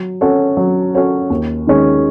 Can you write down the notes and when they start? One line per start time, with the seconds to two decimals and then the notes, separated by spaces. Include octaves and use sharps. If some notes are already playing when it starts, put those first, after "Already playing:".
Already playing: F#3
0.21 C#4 F#4 A4 C#5
0.57 F#3
0.95 C#4 F#4 A4 C#5
1.30 D#2
1.67 D#3 G#3 C#4